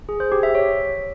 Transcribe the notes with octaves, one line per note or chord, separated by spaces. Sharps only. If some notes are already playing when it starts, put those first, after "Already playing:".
G#4
C5
G4
E5
C#5